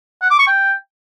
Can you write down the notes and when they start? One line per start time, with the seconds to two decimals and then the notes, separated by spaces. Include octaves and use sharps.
0.22 F#5
0.30 D6
0.39 C#6
0.47 G5